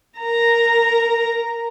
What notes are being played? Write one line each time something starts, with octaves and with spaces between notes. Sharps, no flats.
A#4 A#5